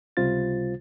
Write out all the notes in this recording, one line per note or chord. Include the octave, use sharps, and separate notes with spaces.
C#2 C3 G3 F4 C5 A6